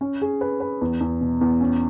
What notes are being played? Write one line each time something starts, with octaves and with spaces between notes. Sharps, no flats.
C#4
G#4
B4
B4
E2
E2
B2
E2
C#4